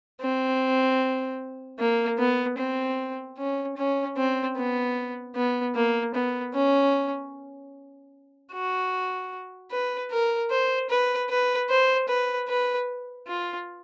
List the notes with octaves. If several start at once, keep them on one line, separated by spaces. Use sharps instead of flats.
C4
A#3
B3
C4
C#4
C#4
C4
B3
B3
A#3
B3
C#4
F#4
B4
A#4
C5
B4
B4
C5
B4
B4
F4